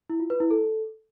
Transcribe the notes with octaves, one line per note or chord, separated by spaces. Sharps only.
E4
F4
B4
E4
A4